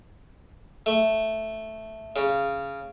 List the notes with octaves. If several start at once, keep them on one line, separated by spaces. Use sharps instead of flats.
A3
C#3